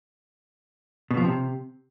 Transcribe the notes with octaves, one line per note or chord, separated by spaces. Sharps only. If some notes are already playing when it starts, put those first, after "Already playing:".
B2
F3
C3